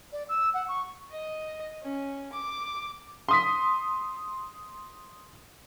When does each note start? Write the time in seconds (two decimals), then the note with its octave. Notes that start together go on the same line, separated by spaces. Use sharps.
0.12 D5
0.29 E6
0.54 F#5
0.68 C#6
1.11 D#5
1.82 C#4
2.32 D6
3.29 C6 D#6 B6